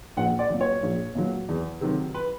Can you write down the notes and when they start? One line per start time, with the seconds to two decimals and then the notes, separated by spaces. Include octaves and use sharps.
0.17 A#1 F#5
0.39 D5
0.50 A#2 F#3
0.61 C#5
0.83 A#1
1.15 A#2 F#3
1.48 E2
1.81 C3 D#3 F#3
2.14 B4